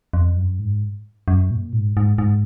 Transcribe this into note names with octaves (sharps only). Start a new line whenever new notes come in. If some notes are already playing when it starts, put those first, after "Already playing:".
F2
F#2
G#2
F#2
A#2
G#2
G#2
G#2